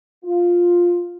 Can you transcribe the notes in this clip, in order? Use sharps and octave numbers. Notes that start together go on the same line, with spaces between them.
F4